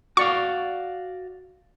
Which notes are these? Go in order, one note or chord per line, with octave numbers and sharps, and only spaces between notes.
F#4 D5 F5 C#6